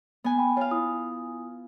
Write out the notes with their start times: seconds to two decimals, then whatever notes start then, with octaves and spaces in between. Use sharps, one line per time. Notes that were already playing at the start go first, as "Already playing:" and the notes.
0.24 B3 G#5
0.38 G5 B5
0.57 F4 C#5 F5
0.71 E4 D#6